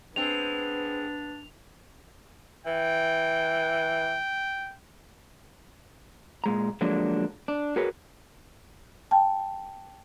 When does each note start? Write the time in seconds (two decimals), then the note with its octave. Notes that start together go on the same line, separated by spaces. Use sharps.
0.16 G#3 B3 C4 D4 F7
2.66 E3 G5
6.44 A#2 G#3 A#5
6.81 D3 F3 F#3 G#3 A#3 D4
7.48 D4
7.76 F#4 G#4 A#4 B4 C#5
9.11 G5 A5